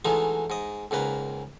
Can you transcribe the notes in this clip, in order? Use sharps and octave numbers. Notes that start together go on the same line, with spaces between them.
E3 F#3 G#3 A3 D#4 F4
G#2 D#5
C#2 G#2 A#3 B4